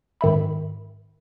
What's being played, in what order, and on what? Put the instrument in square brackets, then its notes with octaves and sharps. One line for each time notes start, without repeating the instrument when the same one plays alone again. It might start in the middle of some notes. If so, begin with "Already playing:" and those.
[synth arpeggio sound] G#2 D#3 E5 B5